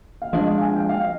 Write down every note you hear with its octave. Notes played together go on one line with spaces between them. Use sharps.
F5
F3 G#3 D4 D#5
F5
G#5
F5
G5
F5
D#5